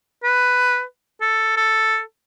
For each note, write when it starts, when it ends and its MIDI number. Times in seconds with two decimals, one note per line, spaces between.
0.23 0.83 71
1.21 1.56 69
1.56 2.00 69